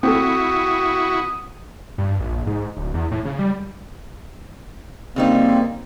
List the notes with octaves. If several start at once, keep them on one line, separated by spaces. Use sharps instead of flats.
C4 E4 F#4 A4 D#6
G2
A#1
G#2
D1
E2
A2
C#3
G3
C#3 G3 A#3 C4 D#4